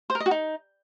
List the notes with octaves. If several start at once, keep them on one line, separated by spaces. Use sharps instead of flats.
C5
A#4
D#5
F#4
D#4